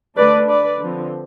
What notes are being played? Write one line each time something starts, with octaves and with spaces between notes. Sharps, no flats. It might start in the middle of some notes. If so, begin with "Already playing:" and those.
D3 A3 D4 B4 D5
B4 D5
D3 F3 C4